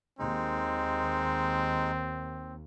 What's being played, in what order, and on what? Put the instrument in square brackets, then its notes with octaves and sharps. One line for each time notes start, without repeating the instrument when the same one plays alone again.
[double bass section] D#2 [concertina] G#3 D#4 [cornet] C4